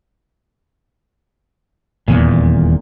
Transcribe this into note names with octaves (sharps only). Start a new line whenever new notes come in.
D#1 E2 A#2